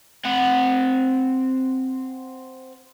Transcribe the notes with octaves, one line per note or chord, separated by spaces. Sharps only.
C4 F#5